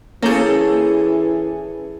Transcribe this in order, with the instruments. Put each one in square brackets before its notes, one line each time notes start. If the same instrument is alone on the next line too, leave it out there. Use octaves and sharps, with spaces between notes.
[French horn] E3 [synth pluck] A#3 G6 [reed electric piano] C#4 [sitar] G#4 A4